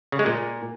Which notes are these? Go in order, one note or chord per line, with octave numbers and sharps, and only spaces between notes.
C#3
G#3
A#2